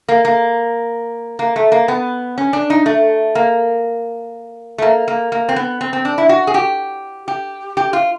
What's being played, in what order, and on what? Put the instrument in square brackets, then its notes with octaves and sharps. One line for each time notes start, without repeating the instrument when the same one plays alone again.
[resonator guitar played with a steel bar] A#3
A#3
A#3
A3
A#3
B3
C#4
D4
D#4
A3
A#3
A3
A#3
A#3
A#3
C4
B3
C4
C4
D4
E4
F#4
G#4
G4
G4
G4
F4